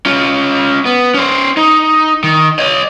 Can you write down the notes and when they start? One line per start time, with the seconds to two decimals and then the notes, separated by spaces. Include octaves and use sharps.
0.06 C#4 F4
0.85 B3
1.14 C#4 C5
1.57 D#4
2.24 D#3
2.59 C#5 D#5